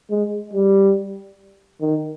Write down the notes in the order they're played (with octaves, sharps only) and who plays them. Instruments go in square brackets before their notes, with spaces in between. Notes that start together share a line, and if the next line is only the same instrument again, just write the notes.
[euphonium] G#3
G3
D#3